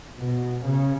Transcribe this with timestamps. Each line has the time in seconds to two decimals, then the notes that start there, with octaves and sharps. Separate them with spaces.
0.18 B2
0.65 C#3